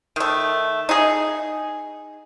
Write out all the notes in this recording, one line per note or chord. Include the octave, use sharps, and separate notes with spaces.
D#3 A3
D#4 G#4